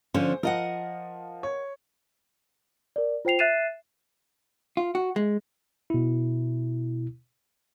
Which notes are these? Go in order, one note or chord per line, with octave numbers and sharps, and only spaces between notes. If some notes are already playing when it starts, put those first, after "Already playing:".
D3 F3 C#4 C5
F3 A#4 D#5 F#5
C#5
A#4 D5
F4 C5 G5 C7 F7
E5 F#6 A6 C7 D#7 E7
F4
F#4
G#3
B2 E4